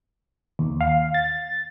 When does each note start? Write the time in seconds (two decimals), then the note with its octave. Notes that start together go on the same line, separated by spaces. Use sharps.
0.59 D#2
0.81 F5
1.14 A6